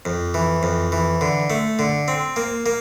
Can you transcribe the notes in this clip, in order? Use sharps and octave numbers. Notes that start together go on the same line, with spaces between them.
F2
E3
F2
E3
D3
A3
D3
C4
A#3
A#3